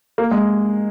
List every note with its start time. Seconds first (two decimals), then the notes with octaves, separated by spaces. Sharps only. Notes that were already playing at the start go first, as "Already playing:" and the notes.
0.18 A#3
0.31 G#3